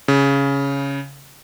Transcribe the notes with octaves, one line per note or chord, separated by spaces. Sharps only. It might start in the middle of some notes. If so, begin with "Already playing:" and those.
C#3